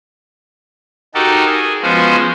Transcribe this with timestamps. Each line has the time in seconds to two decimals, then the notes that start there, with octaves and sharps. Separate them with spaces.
1.15 D#4 F#4 G4 A4 A#4
1.46 G#4
1.82 F3 G#3 B3 C#4 F#4 C5